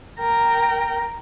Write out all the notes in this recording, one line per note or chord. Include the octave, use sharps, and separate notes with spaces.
A#4 G5